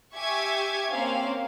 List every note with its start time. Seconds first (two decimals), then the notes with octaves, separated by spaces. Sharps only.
0.14 G4 E5 G#5 C#6 D6 G#6
0.89 A#3 C4 C#4 F5